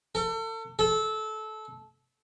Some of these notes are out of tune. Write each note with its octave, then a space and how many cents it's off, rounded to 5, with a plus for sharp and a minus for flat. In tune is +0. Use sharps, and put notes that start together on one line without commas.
A4 +35
A4 -20